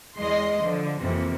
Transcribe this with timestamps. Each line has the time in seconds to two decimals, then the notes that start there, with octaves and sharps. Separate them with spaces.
0.18 E2 G#3 D#5 C6
0.62 D3 F3
1.00 F2 C3 E3 A#3